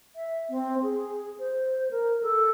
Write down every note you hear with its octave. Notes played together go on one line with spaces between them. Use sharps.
E5
C4
G#4
C5
A#4
A4